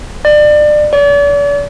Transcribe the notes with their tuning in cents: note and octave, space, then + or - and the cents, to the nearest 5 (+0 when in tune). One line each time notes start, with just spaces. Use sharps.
D5 +30
D5 -45